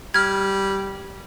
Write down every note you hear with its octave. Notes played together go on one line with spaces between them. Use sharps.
G3 F6 G#6